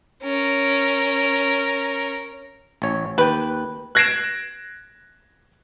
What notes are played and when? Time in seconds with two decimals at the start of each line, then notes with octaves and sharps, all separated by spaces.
0.23 C#4 A#4
2.82 A1 C#5
3.18 D#2 B4 G5
3.95 F#6 G#6 A#6 C7 D7 E7